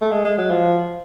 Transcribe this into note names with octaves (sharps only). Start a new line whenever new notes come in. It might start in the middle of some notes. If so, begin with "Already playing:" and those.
A3
G#3
G#3
F#3
F3